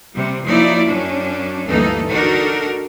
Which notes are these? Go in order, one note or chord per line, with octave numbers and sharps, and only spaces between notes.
C3 G3
F3 F#3 A#3 D#4 E4 D5
F#2 C#4 D4
D2 G2 E3 A#3 D#4 A4
D4 D#4 F#4 A4 A#4